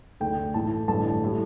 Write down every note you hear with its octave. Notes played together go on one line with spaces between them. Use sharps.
D2 D3 A3 D4 G5
A1 A2 E3 A3 A5
A1 G2 D3 A5
A2 G3